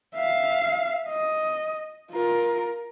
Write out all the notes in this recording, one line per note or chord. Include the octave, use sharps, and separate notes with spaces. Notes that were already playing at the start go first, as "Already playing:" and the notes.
E5 F5
D#5
F4 A#4